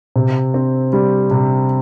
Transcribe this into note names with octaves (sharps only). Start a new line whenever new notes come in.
C3
C4
G3
C3